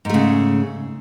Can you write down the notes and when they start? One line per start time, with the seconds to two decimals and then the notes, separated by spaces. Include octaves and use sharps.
0.05 G#2
0.09 A3
0.14 C#3